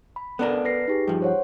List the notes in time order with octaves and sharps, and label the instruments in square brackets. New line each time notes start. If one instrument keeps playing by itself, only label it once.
[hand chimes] B5
[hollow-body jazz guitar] B3 D4 A#4 [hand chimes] A4
[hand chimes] B4 A#6 C7
D#4 G4 G#4
[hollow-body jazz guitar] G2 F3
[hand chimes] C5 C#5 F#5